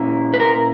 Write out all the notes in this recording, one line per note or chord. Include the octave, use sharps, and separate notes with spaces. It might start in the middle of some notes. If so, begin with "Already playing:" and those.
Already playing: A#2 A#3 C#4 E4
B4
A#4